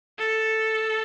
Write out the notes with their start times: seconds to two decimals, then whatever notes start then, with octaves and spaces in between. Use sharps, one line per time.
0.18 A4